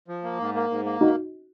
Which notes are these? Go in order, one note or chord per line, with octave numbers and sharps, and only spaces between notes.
F3
A#3
G#2
A#3
G#2
A#3
D#4 F#4